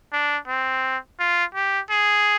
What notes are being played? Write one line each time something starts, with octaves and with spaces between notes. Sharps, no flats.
D4
C4
F4
G4
G#4